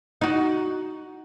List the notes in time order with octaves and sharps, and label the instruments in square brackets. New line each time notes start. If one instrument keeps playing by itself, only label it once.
[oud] D#4 F#4